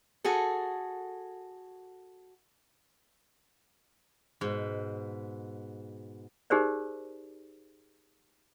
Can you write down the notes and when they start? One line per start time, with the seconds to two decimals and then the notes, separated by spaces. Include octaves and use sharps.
0.24 F#4 G#4 A4
4.41 G#2 B2
6.50 D#4 G4 G#4 A#4 C5 D5